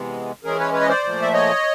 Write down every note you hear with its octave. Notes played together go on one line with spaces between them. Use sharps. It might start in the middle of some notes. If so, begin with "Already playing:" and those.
Already playing: C3 E3 G#3 B3
E3 G#3 C#4 G#4 A#4
B4 C#5
B4 C#5
D#5
C5 D5
A#2 F3 A3
E5
C#5 D#5